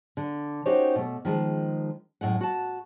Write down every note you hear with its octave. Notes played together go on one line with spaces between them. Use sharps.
D3
C#4 D#4 F#4 G4 C5 C#5
B2 A3
D#3 F3 G#3
F#2 A2 G#3 F#5
F#4 A5